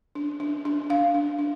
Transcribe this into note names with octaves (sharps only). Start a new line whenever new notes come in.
D4
D4
D4
D4 F5
D4
D4